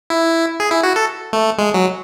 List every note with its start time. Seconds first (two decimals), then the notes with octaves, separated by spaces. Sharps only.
0.10 E4
0.60 G#4
0.71 E4
0.83 F#4
0.96 A4
1.33 A3
1.58 G#3
1.74 F#3